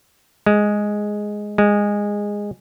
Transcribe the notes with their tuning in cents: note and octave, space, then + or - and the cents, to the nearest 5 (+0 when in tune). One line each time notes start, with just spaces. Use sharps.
G#3 +0
G#3 -15